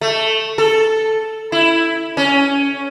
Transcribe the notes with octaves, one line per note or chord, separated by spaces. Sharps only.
A3
A4
E4
C#4